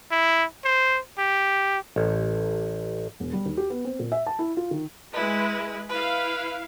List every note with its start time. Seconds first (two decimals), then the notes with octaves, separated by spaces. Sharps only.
0.11 E4
0.65 C5
1.19 G4
1.96 A1
3.20 E1
3.33 G3
3.46 D#2
3.57 G4
3.70 B3
3.85 C4
3.99 A#2
4.12 E5
4.27 A5
4.39 E4
4.57 F4
4.71 D#3
5.14 G#3 E4 B4
5.89 E4 B4 F5